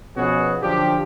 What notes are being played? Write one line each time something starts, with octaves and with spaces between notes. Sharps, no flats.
B2 F3 B3 C#4 F#4 G#4
F#2 D3 F3 D4 G4